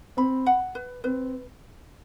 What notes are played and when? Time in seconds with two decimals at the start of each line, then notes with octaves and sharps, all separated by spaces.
0.17 C4 B5
0.46 F#5
0.75 B4
1.04 C4 B4